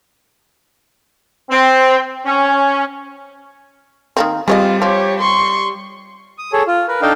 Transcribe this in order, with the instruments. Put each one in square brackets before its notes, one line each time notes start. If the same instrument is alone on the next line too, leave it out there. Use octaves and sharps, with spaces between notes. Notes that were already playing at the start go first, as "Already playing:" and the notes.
[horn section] C4
C#4
[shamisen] D#3 A#3 C4
[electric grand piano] G3 [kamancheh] C4 F4 [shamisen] G#4 C#5 D#5
[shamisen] F3 [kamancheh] G4 C#5
[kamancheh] C6 C#6
[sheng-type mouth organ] D#6
G#4 A4 C#5
F4
A#4 B4
D4 D#4 A4 D#5 F5 G5